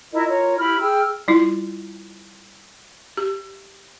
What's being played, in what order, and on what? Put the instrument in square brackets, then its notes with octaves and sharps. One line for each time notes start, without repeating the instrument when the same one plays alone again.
[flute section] E4 A#4 D#5 [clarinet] F4
[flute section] A#4 C#5
[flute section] E4 G4 B5 [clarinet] F6
[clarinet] G#4 [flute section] G5 E6 F6
[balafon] G3 E4 F4
G4